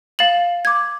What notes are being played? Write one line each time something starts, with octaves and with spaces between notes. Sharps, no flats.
F5 A6 E7 F#7
D6 G#6